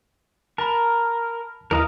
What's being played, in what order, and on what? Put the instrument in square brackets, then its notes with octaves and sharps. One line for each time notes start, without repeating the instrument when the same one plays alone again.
[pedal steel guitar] A#4 [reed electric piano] A5 B5
[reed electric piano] D#2 E3 [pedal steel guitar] A#4 D#5 F5